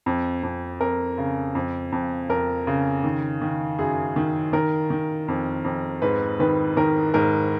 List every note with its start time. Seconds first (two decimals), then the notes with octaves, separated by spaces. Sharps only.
0.06 F2
0.43 F2
0.80 F2 A#4
1.18 C#3
1.55 F2
1.92 F2
2.29 F2 A#4
2.67 C#3
3.04 D#3
3.41 D#3
3.79 F#2 G#4
4.16 D#3
4.53 D#3 A#4
4.90 D#3
5.28 F2
5.64 F2
6.02 G#2 B4
6.39 D#3 B4
6.77 D#3 A#4
7.14 G#2 A#4